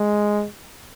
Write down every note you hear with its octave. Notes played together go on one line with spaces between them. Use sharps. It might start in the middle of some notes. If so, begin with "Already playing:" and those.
Already playing: G#3